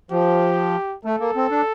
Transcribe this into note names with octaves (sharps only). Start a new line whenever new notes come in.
F3 G4
A3 A4
A#3
C4
D4